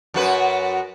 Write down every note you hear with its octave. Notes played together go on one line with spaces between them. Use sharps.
F#2 F#4 B4